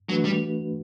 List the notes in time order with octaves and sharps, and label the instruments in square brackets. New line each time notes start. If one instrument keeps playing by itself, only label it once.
[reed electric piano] E3 A3 D4 F#4 B4 [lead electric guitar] F#3
[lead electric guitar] G3